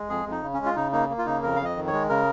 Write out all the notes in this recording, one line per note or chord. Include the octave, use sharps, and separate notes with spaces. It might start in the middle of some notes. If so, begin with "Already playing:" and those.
Already playing: G#3
F2 G#4
F2
D#4
C#3
C#4
G#3
F4
C#3 D#4
A#3 D#4
A#3
F4
C#3 D#4
F2 A#4
F2 F5
D#5
D#3
C#5
G#3
C#3 A#4